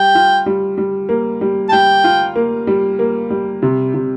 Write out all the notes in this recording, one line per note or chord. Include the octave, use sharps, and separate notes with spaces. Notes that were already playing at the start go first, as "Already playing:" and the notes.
Already playing: G3 G5
F4
G3
G3
A#3
G3
A5
G3 G5
F4
A#3
G3
A#3
G3
C3
C3